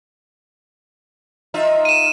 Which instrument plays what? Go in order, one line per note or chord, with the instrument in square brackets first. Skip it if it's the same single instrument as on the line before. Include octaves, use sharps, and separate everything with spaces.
[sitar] D#4 F4 E5
[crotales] D#7 E7